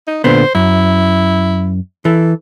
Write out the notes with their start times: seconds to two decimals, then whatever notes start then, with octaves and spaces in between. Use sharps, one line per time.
0.08 D#4
0.24 A#2 D3 B3 C5
0.55 F#2 E4
2.05 E3 A4